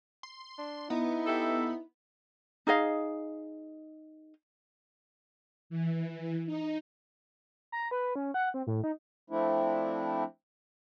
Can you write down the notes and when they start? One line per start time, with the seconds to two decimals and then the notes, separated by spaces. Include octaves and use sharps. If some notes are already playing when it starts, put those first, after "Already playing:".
0.23 C6
0.58 D4
0.90 B3 D#4 E4
1.26 G4 A4 E5
2.67 D#4 G#4 D#5 F5
5.70 E3
6.46 D#4
7.72 A#5
7.91 B4
8.15 C#4
8.34 F#5
8.54 C4
8.67 A2
8.84 D#4
9.30 F3 A3 C4 D4 E4